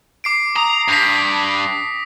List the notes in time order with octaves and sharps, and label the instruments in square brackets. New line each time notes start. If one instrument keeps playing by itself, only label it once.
[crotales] D6 C7 D7
[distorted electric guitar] A#5 [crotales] D#6
[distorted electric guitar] G2 [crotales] A#6 B6